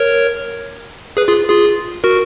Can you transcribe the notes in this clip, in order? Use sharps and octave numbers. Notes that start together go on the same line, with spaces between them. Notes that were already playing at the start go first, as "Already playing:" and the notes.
Already playing: A#4 C#5
G#4 B4
F4 G#4
F4 G#4
F#4 A#4